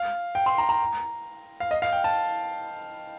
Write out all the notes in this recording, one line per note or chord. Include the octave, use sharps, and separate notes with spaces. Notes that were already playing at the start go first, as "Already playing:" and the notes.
Already playing: F5
G5
C6
A#5
A#5
F5
D#5
F5
G5
A5